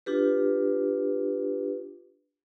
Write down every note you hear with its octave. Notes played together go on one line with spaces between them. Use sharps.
D4 F4 G4 B4